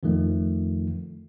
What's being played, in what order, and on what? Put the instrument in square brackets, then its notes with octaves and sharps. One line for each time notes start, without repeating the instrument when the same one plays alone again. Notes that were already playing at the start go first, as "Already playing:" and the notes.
[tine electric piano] F2 D#3 F3 A3